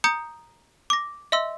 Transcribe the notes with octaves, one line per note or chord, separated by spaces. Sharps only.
A#5 D#6 G6 C#7
D6 A#6
D#5 E5 C6 E6